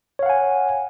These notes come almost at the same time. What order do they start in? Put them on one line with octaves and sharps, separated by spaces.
C#5 F5 F#5 G#5